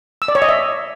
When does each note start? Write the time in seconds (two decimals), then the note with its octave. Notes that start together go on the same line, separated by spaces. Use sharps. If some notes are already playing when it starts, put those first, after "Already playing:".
0.22 E6
0.28 D5
0.35 C#5
0.42 D#5
0.49 E5